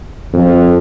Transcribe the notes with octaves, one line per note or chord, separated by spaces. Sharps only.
F2